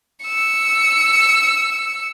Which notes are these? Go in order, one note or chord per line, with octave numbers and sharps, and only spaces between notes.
E6 C#7